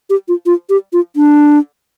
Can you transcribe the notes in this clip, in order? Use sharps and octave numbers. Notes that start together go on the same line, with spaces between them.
G4
F4
F4
G4
F4
D4